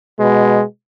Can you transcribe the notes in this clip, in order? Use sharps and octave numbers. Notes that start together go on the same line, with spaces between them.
B2 G#3